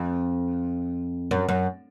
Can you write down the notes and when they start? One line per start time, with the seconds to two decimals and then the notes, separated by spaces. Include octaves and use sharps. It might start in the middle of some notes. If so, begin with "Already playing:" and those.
Already playing: F2
1.31 F#2
1.49 F#2